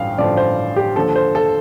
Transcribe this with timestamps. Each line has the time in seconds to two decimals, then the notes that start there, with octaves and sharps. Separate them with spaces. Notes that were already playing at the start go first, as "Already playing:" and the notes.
Already playing: A1 G2 D3 F3 F5 G5
0.18 A1 G2 D3 F3 D5
0.37 C5
0.76 G4
0.96 D#2 D3 F3 A4
1.16 C5
1.35 A4